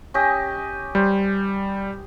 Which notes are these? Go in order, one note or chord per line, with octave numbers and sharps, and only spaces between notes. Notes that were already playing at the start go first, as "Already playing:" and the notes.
C#4 G4 D#5
G3 C5